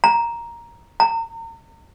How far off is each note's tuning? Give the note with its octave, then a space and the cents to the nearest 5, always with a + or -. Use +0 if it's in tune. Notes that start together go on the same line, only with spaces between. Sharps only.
A#5 +5
A#5 -35